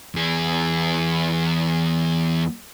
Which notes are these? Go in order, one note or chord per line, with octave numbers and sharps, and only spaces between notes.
E2 G#4